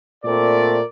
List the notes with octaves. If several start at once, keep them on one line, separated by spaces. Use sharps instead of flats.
A#2 A3 C4 A#4 D5